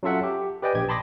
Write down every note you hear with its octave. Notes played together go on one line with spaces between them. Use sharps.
F#3 C#4 F4 A4 E5 F#5
G4
G4 B4 D5 D#5 G5 G#5
A#1 G4 G#6
A5 B5 C6 D6 D#6 A#6